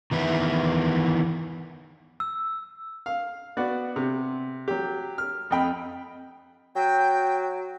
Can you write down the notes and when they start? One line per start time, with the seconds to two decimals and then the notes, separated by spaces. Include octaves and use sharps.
0.11 D#3 E3 B3 E4
2.20 E6
3.06 F5
3.57 B3 F#4 D5 F#5
3.96 C3
4.68 F#3 G4
5.18 F6
5.50 F2 D#5 G5 B5
6.75 F#3 G5